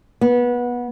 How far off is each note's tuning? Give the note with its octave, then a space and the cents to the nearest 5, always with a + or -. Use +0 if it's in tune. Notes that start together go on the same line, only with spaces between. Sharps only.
B3 -20